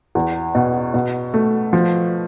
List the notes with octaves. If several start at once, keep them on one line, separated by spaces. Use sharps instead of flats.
E2
B2
B2
A3
F3